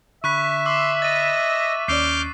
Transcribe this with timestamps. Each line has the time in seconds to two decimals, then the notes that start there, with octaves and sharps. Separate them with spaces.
0.24 D3 E5 B5 C#6 F#6 B6
0.66 C6 D6 E6
1.02 D#5 A6 D#7
1.88 D#2 C#4 D5 D6 F6 G6 C7